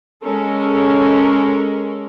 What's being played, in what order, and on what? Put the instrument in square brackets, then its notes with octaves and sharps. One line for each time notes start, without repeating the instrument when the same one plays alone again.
[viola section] G#3 C#4 A4 A#4